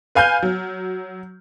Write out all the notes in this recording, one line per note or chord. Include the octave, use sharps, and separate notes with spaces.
B4 F5 G#5 F6 G6
F#3